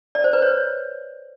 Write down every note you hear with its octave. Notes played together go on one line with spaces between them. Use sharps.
D5
C5
B4
C#5